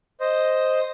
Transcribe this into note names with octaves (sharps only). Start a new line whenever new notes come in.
C5 D#5